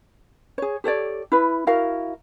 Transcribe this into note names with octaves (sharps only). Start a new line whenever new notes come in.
G#4 C#5
G4 A4 C#5 D5
E4 B4
E4 F#4 A#4 F5